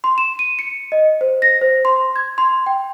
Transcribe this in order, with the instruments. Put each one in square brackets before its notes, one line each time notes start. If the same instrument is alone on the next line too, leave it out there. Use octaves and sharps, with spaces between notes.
[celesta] C6
E7
D#7
C#7
D#5
C5
A#6
C5
C6
G#6
C6
G5